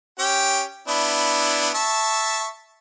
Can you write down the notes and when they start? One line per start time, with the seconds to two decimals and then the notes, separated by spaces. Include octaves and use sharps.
0.19 C#4 G4 G5
0.88 B3 D4 E4
1.75 E5 A5 C#6